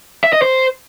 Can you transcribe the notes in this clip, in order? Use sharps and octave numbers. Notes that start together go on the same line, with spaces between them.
E5
D#5
C5